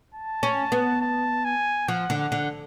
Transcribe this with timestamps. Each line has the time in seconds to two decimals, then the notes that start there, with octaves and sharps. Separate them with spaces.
0.14 A5
0.43 C#4
0.72 B3
1.01 A5
1.45 G#5
1.88 F3 F#5
2.10 D3
2.18 F#5
2.32 D3